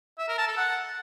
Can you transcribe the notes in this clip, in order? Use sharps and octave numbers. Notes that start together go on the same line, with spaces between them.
E5
A#4
A5
A4
F#5